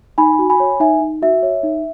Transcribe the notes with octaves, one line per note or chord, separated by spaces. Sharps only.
D#4 G#5 B5
F#4
G#5 B5
C#5
D#4 E5 G#5
D#4
F#4 E5
C#5
D#4